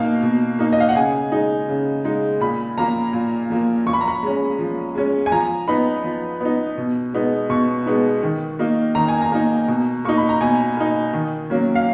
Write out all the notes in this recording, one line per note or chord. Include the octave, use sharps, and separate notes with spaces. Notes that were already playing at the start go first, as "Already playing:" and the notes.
Already playing: B2 A#3 D#4 F5
B2
A#3 D#4
D#5
F5
F#5
C#3 G#5
G#3 D#4
C#3
G#3 D#4
A#2 B5
F3 A#3 A#5
A#2
F3 A#3
F3 C#6
B5
A#5
B5
G#3 C#4
F3
G#3 C#4
G#5
F3 A#5
B3 D#4 B5
F3
B3 D#4
B2
G#3 B3 D#4
B2 C#6
G#3 B3 D#4
D#3
A#3 D#4
D#3 A#5
G#5
A#5
A#3 D#4
B2
A#3 D#4 C#6
B5
A#5
B2 G#5
A#3 D#4
D#3
F#3 A#3 C#4
F5